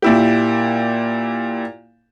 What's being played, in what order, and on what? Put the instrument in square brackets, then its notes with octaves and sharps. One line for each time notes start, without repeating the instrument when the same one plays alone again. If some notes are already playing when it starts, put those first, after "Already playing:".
[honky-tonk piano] A#2 E4 G4